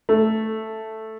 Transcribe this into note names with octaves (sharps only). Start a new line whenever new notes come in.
A3